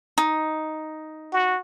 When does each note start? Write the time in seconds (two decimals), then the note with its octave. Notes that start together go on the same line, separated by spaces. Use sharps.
0.18 D#4
1.32 F#4